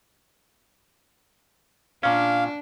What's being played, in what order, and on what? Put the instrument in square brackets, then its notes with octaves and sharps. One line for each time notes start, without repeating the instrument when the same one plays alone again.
[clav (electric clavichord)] A#2 C#4 [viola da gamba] D4 [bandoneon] F5